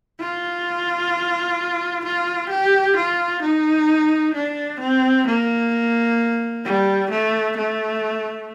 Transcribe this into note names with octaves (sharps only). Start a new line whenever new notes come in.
F4
F4
G4
F4
D#4
D4
C4
A#3
G3
A3
A3